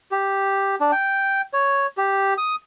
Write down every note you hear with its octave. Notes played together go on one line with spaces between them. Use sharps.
G4
D4
G5
C#5
G4
D#6